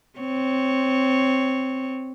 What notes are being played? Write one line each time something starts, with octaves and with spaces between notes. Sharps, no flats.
C4 C#5